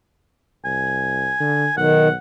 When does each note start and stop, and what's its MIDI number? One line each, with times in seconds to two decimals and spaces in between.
0.65 1.33 36
0.65 1.76 80
1.40 1.67 50
1.77 2.14 35
1.77 2.08 51
1.77 2.15 78